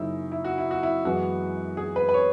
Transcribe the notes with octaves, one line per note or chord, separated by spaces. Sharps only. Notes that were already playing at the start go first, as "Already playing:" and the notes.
Already playing: F#2 C#3 F#3 A#3 C#4 D#4 E4
E4
F#4
E4
F#4
E4
F#2 E3 G#3 B3 F#4
G#4
B4
B4
C#5